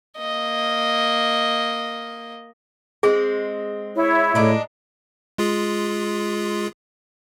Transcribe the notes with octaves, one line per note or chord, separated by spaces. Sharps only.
A#3 D#5
G#3 C4 G#4
E4 C#5
A2 G#3 D4 D#4
G#3 F4 G#4